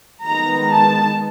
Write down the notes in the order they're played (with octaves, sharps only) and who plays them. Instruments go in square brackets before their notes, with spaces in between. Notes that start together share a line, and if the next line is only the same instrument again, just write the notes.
[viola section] D#3 G#3 B3 A#5
A5